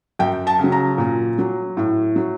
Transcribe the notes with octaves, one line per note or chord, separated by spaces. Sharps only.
F#2 G5
A5
C#3 F#3
A#5
A#2
F#3
A2
F#3